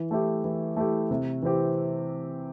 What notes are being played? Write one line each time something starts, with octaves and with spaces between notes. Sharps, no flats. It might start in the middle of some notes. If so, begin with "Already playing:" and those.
Already playing: E3
A3 E4 G4
E3
A3 E4 G4
C3
E3 C4 G4